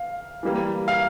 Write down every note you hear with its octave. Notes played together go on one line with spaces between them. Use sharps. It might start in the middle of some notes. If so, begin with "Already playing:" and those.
Already playing: F5
E3 G3 A#3
F5